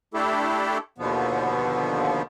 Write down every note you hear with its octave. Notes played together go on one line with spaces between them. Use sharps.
A3 D4 E4 G4 A4
D#2 B2 D3 F3 B3